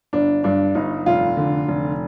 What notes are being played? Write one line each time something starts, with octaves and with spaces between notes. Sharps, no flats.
G1 D4
G2 D4
G1 D#4
F1 F4
D3
F1